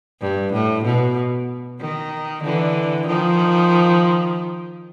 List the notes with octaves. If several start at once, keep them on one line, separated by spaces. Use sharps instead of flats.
G2
A2
B2
D#3
D3 E3
D#3 F3